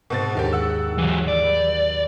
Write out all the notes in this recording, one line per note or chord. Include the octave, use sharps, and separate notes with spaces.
G#2 B2 C4 F#5 A5 A6
D#2 D3 D#3 G#3 G4
F#5 E6
E3 F#3
D5
B4 G6